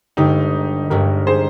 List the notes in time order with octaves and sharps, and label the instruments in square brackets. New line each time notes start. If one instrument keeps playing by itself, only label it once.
[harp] G1 G2 D3 G#3 [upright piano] D#4 G4
[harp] G1 G2 D3 G#3 [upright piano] G4 A#4
[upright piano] G#4 C5